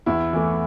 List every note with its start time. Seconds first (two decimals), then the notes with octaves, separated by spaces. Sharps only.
0.06 E2 E4
0.33 E3 A3